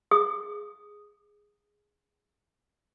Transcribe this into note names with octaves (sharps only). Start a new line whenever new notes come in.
G#4 D#6